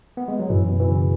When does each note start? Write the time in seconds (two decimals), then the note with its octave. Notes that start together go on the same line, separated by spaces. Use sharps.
0.17 B3
0.28 G#3
0.39 F#3
0.50 F#2 E3
0.69 B2
0.80 E3
0.88 C#3